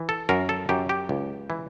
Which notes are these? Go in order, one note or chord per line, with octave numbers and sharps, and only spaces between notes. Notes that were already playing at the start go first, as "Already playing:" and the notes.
Already playing: E3
A4
F#2 A#4
A4
F#2 G4
G4
C#2
E3